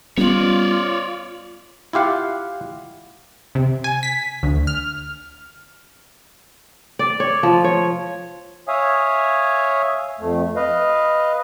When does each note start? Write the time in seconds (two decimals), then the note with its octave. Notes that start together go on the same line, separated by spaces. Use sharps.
0.18 G3 B3 C#4 F4 C#5 D5
1.93 E4 F4 G4 F5 F#5
3.55 C3
3.84 G#5
4.03 B6
4.43 D2
4.67 F6
6.99 D5
7.20 C#5
7.43 F3
7.64 C#5
8.68 C#5 E5 F5 G#5 D#6
10.20 F2 A3
10.56 B4 D#5 F5